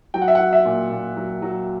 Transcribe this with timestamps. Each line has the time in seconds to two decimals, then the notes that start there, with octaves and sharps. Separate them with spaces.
0.14 F#3 G5
0.22 F#5
0.28 E5
0.35 F#3 F#5
0.53 E5
0.65 A#2
0.91 A#2
1.17 F#3
1.42 F#3